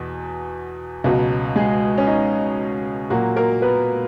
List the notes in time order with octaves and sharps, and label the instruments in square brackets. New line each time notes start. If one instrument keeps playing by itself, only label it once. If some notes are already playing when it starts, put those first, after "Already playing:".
Already playing: [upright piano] E2 B2
C#2 B2 F#3
G#3 G#4
C#4
D#4
A#2 F#3 A#3 F#4
A#3 A#4
B3 B4